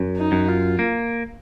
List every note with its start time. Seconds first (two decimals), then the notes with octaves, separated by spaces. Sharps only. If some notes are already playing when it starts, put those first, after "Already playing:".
Already playing: F#2
0.17 D#4
0.32 F#2
0.48 F4
0.79 A#3